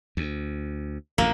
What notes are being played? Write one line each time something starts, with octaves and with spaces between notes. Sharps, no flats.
D2
A1 F2 A#2 A#3